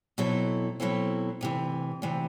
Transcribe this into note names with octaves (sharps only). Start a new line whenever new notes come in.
B2 F#3 C4 E4 A4
B2 F#3 C4 E4 A4
D2 C3 E3
D2 C3 E3